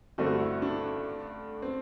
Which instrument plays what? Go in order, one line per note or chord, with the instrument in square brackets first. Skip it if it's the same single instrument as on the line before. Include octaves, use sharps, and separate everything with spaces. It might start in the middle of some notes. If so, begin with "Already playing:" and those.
[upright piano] G2 D3 A3 C4 [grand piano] F#4
[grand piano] E4
D4
C4